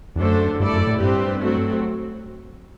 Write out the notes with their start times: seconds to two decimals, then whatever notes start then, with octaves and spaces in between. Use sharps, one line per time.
0.16 E2
0.20 F#2 D3 A3 D4 A4 C5
0.59 G2 A3 E4 A4 D5
0.73 F#2
0.87 A2
1.00 G2 C4 G4 B4
1.41 F#3 A3 C4 F#4